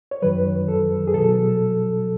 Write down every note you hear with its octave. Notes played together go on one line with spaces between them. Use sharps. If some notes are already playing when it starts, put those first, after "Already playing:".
C#5
F#2 D#3 F#3 B4
A4
G#4
B2 F#3 A4